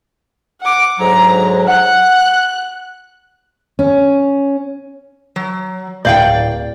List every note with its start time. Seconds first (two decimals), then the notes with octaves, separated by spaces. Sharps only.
0.61 F#5 D6
0.99 D2 G#2 F#3 A#5
1.68 F#5 F#6
3.79 C#4
5.36 F#3
6.05 D1 D5 F5 G5 G6